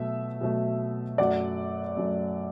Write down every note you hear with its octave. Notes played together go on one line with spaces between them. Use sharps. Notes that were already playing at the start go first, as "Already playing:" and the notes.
Already playing: B2 F#3 A3 E5
B2 F#3 A3
F#2 F#3 A3 D5 F#5
F#2 F#3 A3